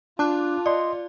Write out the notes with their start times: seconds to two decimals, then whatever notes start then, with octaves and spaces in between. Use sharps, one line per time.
0.19 D4 F4 A5 D6 F#6
0.66 D5 D#5 C6